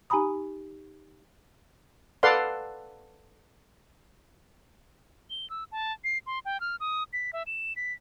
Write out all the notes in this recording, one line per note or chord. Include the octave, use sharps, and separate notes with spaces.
D#4 G4 G#5 A#5 B5 D#6
A4 B4 D5 F5 F#5 C6
G7
E6
A5
C7
C6
G5
F6
D#6
B6
E5
E7
B6